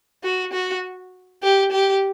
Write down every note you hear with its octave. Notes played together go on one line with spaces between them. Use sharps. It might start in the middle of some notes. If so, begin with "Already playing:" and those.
F#4
F#4
G4
G4